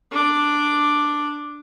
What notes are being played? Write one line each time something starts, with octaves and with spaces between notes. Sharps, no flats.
D4 D6